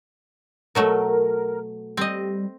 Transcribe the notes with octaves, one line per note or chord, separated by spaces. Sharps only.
B2 F#3 A3 A#4
G3 C4 D#5